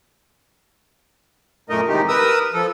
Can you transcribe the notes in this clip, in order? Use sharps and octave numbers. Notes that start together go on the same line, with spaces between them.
F#2 A#2 A3 D#4 A#4 D#5
C3 D#3 E3 G#3 D#4 G4
A#4 B4 D#6 E6
F3 A4